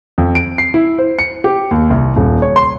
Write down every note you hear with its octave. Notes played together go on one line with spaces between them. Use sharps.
F2
D7
C7
E4
C5
C#7
G4
D#2
C2
D#1
C#5
C6